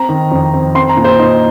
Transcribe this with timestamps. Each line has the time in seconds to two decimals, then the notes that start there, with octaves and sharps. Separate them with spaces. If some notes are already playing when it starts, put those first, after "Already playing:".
Already playing: C4 A#5
0.09 D#3
0.31 F2
0.53 C4
0.75 C4 C6
0.89 A#5
0.97 A#2
1.04 C5
1.19 D#4